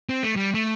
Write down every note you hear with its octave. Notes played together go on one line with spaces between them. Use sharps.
C4
A3
G3
A3